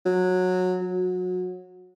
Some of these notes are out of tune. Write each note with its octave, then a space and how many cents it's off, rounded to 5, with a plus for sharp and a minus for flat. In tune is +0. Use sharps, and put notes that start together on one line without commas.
F#3 -15
F#3 -25